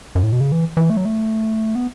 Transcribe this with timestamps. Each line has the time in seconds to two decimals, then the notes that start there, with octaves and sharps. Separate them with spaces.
0.15 F#2
0.23 A2
0.32 B2
0.40 C#3
0.52 E3
0.77 E3
0.90 A3
0.97 F#3
1.05 A3
1.75 B3